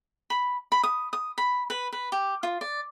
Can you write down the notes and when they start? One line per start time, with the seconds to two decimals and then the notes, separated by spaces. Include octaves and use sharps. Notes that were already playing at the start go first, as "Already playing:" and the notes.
0.30 B5
0.72 B5
0.83 D#6
1.13 D#6
1.38 B5
1.70 B4
1.92 B4
2.12 G4
2.43 F4
2.61 D5